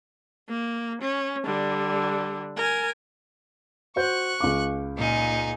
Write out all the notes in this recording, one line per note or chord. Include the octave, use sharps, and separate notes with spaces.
A#3
C#4
D3 G3
A#4 G#5
F#4 C5 C#6 F#6 G6
C#2 F5 D6
A#2 D#4 G#5